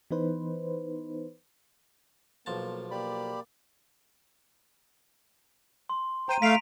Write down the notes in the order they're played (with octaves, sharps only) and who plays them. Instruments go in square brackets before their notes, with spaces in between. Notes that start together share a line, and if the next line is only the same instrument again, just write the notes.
[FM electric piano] E3 B3 D#4 B4 C5
[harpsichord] B1 F3 A5 [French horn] A#3
[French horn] A#3 [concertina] G4 D5 B5
[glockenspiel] C6
[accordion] C5 G5 [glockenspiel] A#5 D#7
[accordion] A3 F5 [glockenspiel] B6 D7 F7